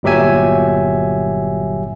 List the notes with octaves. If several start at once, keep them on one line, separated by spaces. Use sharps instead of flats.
G1 A#2 F#3 G4 E5 G#5